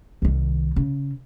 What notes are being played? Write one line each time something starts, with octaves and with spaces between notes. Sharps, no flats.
C2 D#3
C#3